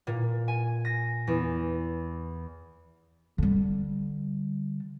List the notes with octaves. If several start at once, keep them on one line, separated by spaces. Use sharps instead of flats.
A#2
G#5
A#6
E2
D3 G3